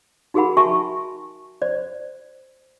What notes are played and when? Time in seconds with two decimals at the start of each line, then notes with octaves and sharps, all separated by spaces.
0.34 D#4 F#4 G#4 A#4 F#5 B5
0.57 F#4 E5 G#5 A5 C#6
1.62 C5 D5